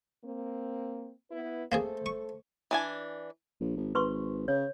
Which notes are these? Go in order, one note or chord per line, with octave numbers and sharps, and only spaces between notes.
A#3 C4
B3 E4 B4
A3 A#3 C4 G#4 A4 C5
C#6
E3 D4 G#5
A#1
G#1
G#1 B4 C6 C#6
C#3 C#5